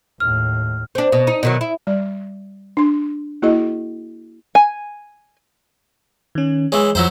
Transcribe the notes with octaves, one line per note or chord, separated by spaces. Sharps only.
D#2 A2 F6
C4 D4
B2
D#4
B2 D#3 F#3
E4
G3 D5
D4 C6
A#3 E4 F#4 G#4 D#5
G#5
D#3 C#4
E3 G#3 C#5
F2 F3 F#3 E4 C5